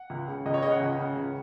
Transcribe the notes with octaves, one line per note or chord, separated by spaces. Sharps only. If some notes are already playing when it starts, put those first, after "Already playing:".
Already playing: F#5
C#2
C#3
C#2 D#5
C#5
C#3 D#5
F#5
C#2
C#3
C#2